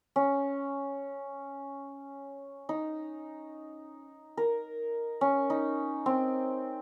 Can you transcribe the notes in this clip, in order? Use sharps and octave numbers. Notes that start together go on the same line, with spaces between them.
C#4
D#4
A#4
C#4
D#4
C4